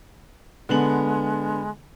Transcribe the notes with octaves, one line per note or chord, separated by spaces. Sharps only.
D3 G#3 B3 F#7